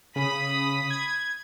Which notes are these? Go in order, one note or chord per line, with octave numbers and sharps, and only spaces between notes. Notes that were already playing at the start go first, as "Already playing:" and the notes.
C#3 B5 D#6 B6
G#6